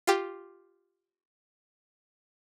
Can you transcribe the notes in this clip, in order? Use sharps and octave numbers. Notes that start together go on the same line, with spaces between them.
F4 G4